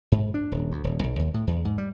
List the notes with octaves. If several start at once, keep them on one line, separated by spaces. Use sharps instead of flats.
G#2
D4
D#1
D2
D#1
B1
D#2
A2
E2
G#2
G3